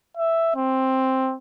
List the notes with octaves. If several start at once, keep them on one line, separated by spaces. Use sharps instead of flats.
E5
C4